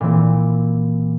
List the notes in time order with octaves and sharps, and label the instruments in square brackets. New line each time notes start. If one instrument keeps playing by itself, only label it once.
[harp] A#2 E3 C4 D5